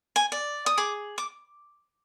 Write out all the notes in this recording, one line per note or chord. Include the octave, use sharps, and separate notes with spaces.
G#5
D5
D#6
G#4 D6
D6